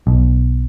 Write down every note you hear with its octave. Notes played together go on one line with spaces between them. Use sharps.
B1